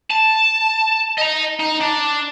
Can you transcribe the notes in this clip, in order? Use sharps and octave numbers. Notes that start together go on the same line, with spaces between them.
A5
D#5 A#5
D#4
D4